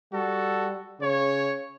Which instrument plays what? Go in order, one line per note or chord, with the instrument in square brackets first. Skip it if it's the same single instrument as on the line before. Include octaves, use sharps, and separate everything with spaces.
[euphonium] G3 [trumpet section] F#4 A4
[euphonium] C#3 [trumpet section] C#5